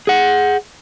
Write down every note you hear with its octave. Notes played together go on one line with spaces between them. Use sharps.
G#4 F#5